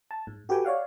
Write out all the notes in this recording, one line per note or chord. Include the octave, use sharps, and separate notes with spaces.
A5
G#2
F#4 G4 A4 B4 G5 G#5
C#5 D5 F5 F#5